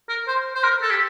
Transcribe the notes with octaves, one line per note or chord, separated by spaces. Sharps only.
A#4
C5
C5
A#4
A4
G4